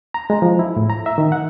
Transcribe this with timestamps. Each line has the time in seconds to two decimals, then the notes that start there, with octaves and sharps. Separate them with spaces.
0.14 A#5
0.30 G#3
0.42 F3
0.59 E4
0.77 A2
0.90 A#5
1.06 E5
1.18 D#3
1.32 F#5